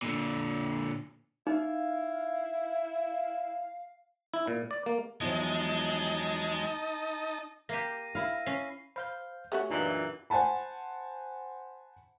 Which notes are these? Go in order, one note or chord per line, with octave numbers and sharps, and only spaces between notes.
A#2 D3
D#4 E4 F5
E4
A#2
D5
A#3
E2 F3 F#3 G#3 D#4 D#5 A5
A#3 G4 A#6 C7 D#7
E4 F5
C#4 C7
C5 F5 B5 G6
A3 C#4 F#4 G4
F#2 A#2 E3 D4 D#4 F4
C5 F#5 G#5 A5 B5